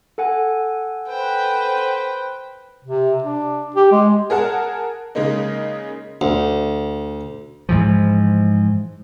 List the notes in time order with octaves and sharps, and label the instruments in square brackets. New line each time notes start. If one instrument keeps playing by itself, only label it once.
[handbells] A4 F#5 G#5
[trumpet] B4 [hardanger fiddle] C5 G5
[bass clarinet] C3
D4
G4
G#3
[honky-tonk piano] G#4 A#4 F#5 A5
C#3 G#3 A#3 D#4
[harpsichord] D2
[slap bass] G#2 E3 F3